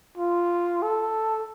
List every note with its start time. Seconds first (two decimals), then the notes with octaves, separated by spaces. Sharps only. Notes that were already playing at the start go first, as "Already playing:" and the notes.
0.18 F4
0.83 A4